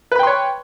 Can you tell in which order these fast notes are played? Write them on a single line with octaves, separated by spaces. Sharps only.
B4 B5 G5 C6 C#5